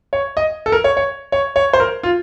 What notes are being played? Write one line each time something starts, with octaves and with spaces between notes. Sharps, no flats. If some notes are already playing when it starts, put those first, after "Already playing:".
C#5
D#5
A4
A#4
C#5
C#5
C#5
C#5
C5
A#4
F4